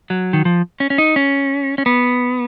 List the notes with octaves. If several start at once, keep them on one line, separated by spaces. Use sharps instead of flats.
F#3
D#3
F3
C#4
C#4
D#4
C#4
C#4
B3